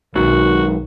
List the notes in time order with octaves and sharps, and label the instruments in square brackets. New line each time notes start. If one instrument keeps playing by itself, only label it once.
[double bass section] B1 [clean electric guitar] G#2 F#3 [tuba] D#3 [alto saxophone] F#4